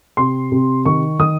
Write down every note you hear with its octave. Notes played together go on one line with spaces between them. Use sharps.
C3 C6
C3
D#3 C#6
D#3 D#6